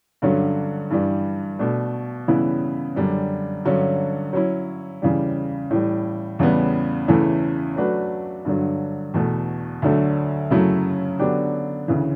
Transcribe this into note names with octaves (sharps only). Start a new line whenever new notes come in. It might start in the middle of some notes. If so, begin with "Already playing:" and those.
G2 D3 F#3 C#4
G2 E3 G3
B2 A3 D4
C#3 E3 G3 B3 E4
F#2 D3 G3 D4
G2 D3 F#3 C#4
F#3 C#4 E4
E2 C#3 E3 G3
A2 E3 G3
E2 C#3 G3 B3
E2 C#3 E3 A3 E4
F#3 A3 D4 F#4 B4
G2 D3 F#3
E2 B2 A3
D2 D3 F#3 A3
F#2 C#3 F#3 A3 E4
D3 F#3 B3 D4 G4
D2 C#3 E3